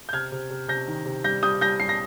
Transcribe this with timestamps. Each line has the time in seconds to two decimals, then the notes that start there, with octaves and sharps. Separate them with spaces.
0.09 G6
0.13 C3 F6 G#6
0.32 C3
0.50 C3
0.68 C3 G6 A#6
0.88 D#3
1.06 C3
1.24 G3 G6 A#6
1.43 G3 D#6 G6
1.61 G3 G6 A#6
1.80 G3 C7
1.89 A#6